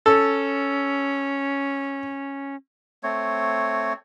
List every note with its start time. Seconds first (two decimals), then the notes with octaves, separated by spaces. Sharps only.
0.06 C#4 A4
3.03 A3 C4 C#5